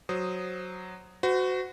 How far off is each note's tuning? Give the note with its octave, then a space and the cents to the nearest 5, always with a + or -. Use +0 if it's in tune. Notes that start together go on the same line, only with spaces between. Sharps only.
F#3 +0 C5 +0 D#6 +0
F#4 +0 C5 -45